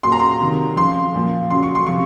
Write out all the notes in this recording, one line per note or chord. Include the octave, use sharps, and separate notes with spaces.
A#2 F#3 C6
A#5
C6
C3 D#3 F#3
C#3 F3 C6
A#2 F3
C#3 F#3 C6
C#6
C6
C3 F3 C#6